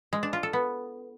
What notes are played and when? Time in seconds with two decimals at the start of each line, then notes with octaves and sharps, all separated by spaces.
0.13 G#3
0.23 D4
0.33 F4
0.43 A4
0.53 B3